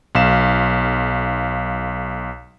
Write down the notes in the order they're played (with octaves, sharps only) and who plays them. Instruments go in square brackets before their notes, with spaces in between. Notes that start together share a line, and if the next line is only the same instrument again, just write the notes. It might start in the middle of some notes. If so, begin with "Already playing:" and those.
[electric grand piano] B1 F5 E7